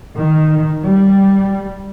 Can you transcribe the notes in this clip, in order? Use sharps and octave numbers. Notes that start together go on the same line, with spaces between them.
D#3
G3